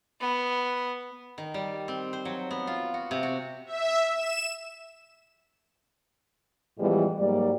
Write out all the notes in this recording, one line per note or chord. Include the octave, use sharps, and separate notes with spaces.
B3
D#3
G3
C4
C5
F#3
B3
F4
F#4
C3
F#4
E5
E7
A2 E3 F3 G3 G#3 B3
G#2 F#3 G3 A#3 D5